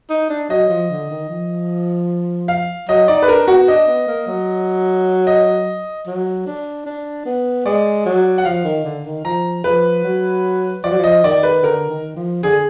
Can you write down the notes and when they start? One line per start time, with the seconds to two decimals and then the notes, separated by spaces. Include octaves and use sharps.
0.10 D#4
0.30 D4
0.50 F#3 D#5
0.69 F3
0.90 D3
1.10 D#3
1.29 F3
2.48 F5
2.89 F#3 D#5
3.08 D#4 D5
3.22 B4
3.28 D4 A#4
3.48 B3 F#4
3.68 D4 D#5
3.88 B3
4.07 A#3
4.27 F#3
5.27 D#5
6.07 F#3
6.47 D4
6.86 D4
7.26 B3
7.65 G#3 D5
8.06 F#3
8.38 F#5
8.45 F3 F5
8.64 D#3
8.85 D3
9.05 D#3
9.25 F3 A#5
9.64 F3 B4
10.04 F#3
10.84 F3 D5
10.91 F#3
10.99 F3
11.04 D#5
11.24 D#3 D5
11.43 B4
11.63 D3 A#4
11.89 D#3
12.16 F3
12.43 D3 G#4